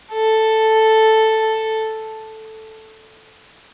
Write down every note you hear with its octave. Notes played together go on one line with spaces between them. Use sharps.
A4